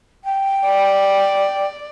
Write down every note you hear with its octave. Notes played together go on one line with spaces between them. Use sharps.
G5
D5